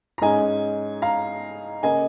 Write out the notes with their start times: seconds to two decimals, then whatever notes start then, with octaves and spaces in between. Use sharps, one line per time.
0.18 A#5
0.21 G#2 G#3 C#4 D#5 G#5
1.02 F5 A#5
1.83 C#3 A#3 C#4 D#5 G#5